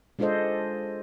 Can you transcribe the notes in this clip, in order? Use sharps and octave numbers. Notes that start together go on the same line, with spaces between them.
G#3 D4 F4 A4 C5 D#5